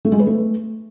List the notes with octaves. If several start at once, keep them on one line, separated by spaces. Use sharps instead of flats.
A3
G#3
B4
A3